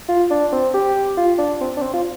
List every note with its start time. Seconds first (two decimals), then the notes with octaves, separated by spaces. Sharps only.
0.09 F4
0.31 D4
0.52 C4
0.74 G4
1.18 F4
1.38 D4
1.61 C4
1.77 D4
1.82 C4
1.94 F4